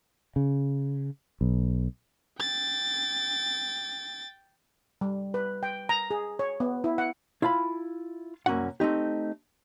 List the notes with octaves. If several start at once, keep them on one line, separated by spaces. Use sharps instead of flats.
C#3
B1
G5 A6
G3
B4
G5
A#5
G#4
C#5
B3
E4
F#5
E4 F4 F5 A5 B5
C2 F#2 A#3 C#4 F#4 F#5
A3 C4 D#4 G4